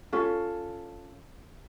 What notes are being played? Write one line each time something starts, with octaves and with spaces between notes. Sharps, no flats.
C#4 F4 A4